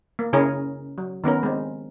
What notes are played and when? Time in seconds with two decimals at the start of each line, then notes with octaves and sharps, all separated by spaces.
0.19 A#3
0.33 C#3 C#4 E4 G#4 A#4 C#5
0.98 F#3
1.24 D#3 B3 C#4 A#4
1.43 G#3 C4